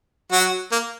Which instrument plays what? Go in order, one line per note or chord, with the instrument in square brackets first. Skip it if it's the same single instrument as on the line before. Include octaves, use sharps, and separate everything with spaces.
[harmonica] F#3 F#4
A#3